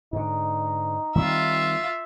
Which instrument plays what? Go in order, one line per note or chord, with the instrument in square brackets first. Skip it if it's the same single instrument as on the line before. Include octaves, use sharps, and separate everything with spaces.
[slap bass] G#2 D3 [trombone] D#4
[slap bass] D#3 G3 C4 [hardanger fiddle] F4 E5